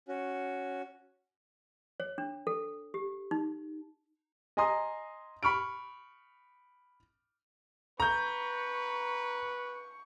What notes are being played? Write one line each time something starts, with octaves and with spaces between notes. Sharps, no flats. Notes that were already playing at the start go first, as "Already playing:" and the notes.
C#4 F#4
C#5
D4
A4
G4
D#4
D#5 G#5 A#5 C6 D#6
B5 C#6 F6 D7
B4 A#5 C#6 G6